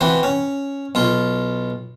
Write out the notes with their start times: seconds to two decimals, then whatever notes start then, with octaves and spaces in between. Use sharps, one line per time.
0.01 E3 C4 F#4
0.23 C#4
0.95 B1 F4